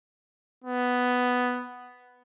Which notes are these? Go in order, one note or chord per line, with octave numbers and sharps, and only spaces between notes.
B3